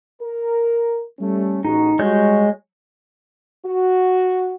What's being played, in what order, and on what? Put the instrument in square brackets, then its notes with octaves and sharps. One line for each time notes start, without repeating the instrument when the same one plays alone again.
[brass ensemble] A#4
G3 A3 C#4
[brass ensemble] A1 F#4 G#4 [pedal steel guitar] D#4
[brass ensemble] G3 F#4 G4 [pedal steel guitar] G#3 C#5 G6
[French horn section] F#4